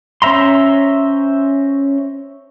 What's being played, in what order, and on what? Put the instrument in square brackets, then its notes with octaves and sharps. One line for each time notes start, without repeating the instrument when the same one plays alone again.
[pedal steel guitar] C#4 C5 E5 A#5 C6